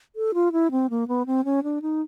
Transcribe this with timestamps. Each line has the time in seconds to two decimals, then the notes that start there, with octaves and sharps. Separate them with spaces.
0.16 A4
0.34 F4
0.52 E4
0.71 C4
0.90 A#3
1.08 B3
1.26 C4
1.45 C#4
1.63 D4
1.82 D#4